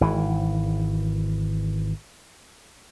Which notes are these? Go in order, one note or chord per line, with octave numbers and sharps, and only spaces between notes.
G#1 E3